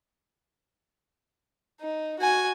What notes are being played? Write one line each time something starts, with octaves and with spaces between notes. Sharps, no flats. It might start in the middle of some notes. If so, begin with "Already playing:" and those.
D#4
F#4 G#5